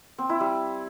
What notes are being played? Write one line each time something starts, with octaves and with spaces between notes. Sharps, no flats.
C4
E4
G3